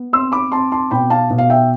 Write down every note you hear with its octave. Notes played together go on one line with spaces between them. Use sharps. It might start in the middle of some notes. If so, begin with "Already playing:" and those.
Already playing: B3
C4 C6 E6
B5 D6
C4 A5 C6
A5 C6
B2 G5 B5
F5 A5
B2
F5
E5 G5